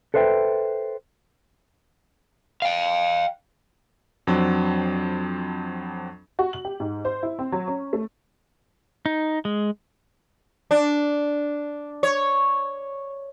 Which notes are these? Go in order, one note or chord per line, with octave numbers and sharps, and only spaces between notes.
A4 B4 C5 E5 G5
F5 G5
F2 F#3 C4 D4
F#4
F#7
G4
G#2
C5
E4
C4
F#3
C#4
A3
D#4
G#3
D4
C#5